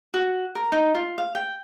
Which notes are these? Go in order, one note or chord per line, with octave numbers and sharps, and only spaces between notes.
F#4
A#4
D#4
F4
F5
G5